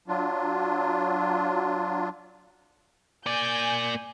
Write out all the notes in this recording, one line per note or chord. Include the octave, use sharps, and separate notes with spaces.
F#3 D4 F4
A#3 D5 G#5 G6